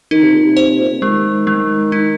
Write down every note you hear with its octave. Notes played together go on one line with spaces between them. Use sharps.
D#3 D#4
C3
A#2
C3
C5
A#2
C3
D#3 G#3
G#3
D#4